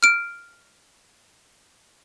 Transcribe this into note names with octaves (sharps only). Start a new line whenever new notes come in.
F6 D7